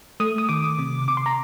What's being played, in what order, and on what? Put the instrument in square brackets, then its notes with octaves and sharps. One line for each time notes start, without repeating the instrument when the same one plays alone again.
[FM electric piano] A3 D#6
D#6
D#3 D6
C3
C3 D6
C6
A#5